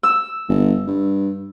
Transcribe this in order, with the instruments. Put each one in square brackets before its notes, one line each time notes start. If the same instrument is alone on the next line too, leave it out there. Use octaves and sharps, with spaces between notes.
[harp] E6
[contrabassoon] G1
G2